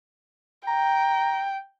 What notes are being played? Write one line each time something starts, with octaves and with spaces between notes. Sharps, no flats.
G5 A#5